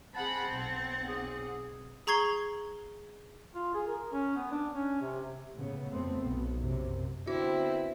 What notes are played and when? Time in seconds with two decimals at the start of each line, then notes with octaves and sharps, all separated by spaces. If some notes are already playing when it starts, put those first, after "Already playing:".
0.15 C4 G#4 F#5 A5 B5
0.47 B1 F#5
1.08 G#4
2.07 G#4 A#5 C#6 G#6 C7 G7
3.55 F4
3.74 G#4
3.87 A#4
4.12 C#4
4.36 B3
4.51 D4
4.74 C#4
5.01 C3
5.55 A2 C#3 B3
5.91 F2 A3 B3 C4
6.23 B1 B3
6.58 F#2 C3
7.27 D3 B3 C4 E4 F#4